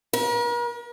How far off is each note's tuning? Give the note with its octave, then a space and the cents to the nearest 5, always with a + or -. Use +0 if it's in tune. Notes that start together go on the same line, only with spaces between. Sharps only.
A#4 +45